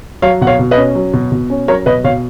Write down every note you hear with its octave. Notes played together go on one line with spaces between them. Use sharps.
F#3 C#5 F5
B2 F#5
C#5 F5
B2
B4 D#5
C#4
F#3
B2
B2
C#4
F#3 A#4 C#5
B2 B4 D#5
B2 C#5 F5